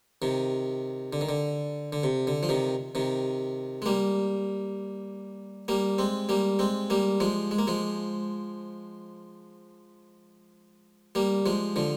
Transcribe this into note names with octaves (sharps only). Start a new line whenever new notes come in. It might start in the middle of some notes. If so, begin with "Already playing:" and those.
C3 D#3
D3
D#3
D3
D3
C3
D3
F3
C3 D#3
C3 D#3
G#3
G3 A#3
G3 A#3
G#3 C4
G3 A#3
G#3 C4
G3 A#3
F3 G#3
G#3
A#3
F3 G#3
G3 A#3
F3 G#3
D3 F3